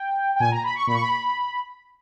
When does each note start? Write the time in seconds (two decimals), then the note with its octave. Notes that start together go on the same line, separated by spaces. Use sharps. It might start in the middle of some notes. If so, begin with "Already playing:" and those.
Already playing: G5
0.36 G5
0.40 A#2 G#5
0.51 A#5
0.64 B5
0.75 C#6
0.87 A#2 B5
0.94 C#6
1.01 B5